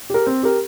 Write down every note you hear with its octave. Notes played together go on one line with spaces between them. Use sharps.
G4 A#4
C4
G4 A#4